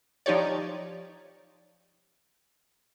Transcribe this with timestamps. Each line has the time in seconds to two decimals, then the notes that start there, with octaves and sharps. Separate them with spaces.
0.26 F3 D#4 G4 C#5 D5